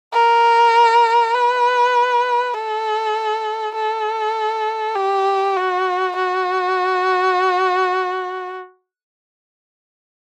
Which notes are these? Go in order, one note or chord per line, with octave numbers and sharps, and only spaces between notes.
A#4
B4
A4
A4
G4
F#4
F#4